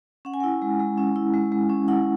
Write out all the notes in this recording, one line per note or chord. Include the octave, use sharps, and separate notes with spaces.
C#4 F#5
G#5
E4 F#5
G#3
G#3
C#4
E4
G#3
G#3
C#4
E4 F#5